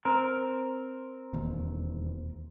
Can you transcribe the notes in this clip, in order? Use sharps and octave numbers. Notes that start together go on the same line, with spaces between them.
C4 A#4
E1 D#2